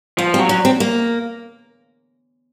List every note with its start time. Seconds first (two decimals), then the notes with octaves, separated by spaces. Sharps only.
0.18 F3 B3
0.34 C4
0.39 F#3
0.49 C#4
0.65 C4
0.80 A#3